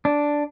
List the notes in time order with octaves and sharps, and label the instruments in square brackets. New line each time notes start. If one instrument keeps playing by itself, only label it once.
[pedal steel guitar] D4